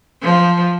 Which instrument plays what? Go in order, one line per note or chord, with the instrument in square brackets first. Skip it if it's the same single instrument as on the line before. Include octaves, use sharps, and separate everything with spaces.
[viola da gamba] F3